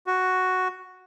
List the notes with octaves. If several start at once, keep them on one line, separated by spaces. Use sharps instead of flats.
F#4